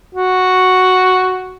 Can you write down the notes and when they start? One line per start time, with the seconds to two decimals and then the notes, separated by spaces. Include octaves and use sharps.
0.15 F#4